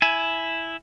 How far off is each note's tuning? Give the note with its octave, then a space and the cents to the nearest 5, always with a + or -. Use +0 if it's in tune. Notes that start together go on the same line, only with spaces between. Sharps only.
E4 +0 G#5 +15